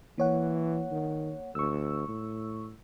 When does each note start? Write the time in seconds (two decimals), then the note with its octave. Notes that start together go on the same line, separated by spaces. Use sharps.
0.18 E3 A#3 C#5 F#5
0.91 D#3
1.55 D2 C#6 E6
2.08 A2